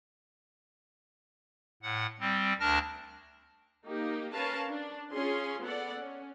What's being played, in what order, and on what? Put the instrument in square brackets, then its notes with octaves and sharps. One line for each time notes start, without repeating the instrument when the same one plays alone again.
[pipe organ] A2 F#5
G3 C4
D2 D4 A#4 A5 F6 A#6
[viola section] A#3 D#4 G4
C#4 A#4 B4 F5 A5
D4
C#4 F4 G#4 C6
B3 A4 D5 F#5
C#4